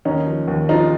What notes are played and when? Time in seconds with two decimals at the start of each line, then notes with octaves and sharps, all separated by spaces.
0.05 D#2 C#4 D#4
0.26 F3
0.48 D#2
0.69 F3 D#4 F4